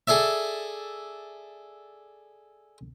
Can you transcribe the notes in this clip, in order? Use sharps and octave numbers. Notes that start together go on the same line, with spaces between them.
G#4 A4 D5 E5